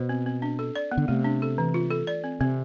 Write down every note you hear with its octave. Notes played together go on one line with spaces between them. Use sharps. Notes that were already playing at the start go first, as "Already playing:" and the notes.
Already playing: B2 C5
C4
C4
D4
A4
D5
B3
D3
C3 A3
D4
A4
E3
F4
A4
D5
C4
C3 C4